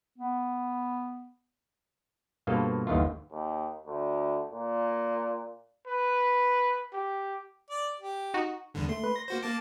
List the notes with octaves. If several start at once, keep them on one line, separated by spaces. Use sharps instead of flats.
B3
G2 B2 A#3 F4 A4 C5
G1 D#2 D#3 E3 F4
D#2
D2
A#2
B4
G4
D5
G4
D#4 F#4
E2 G2 D3
A3 C6
B4
A#6
A#3 F#4 C5
A#3 A5 D6